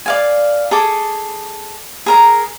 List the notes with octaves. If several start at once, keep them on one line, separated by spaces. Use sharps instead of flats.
D5 F5 G#5
G#4 A4 D6
G#4 A#4 A#5